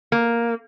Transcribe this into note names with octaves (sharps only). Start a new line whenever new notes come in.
A#3